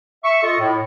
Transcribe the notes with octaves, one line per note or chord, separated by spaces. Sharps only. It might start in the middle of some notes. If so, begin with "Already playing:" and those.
E5 C#6
F4 A4 D#5 C#6
A2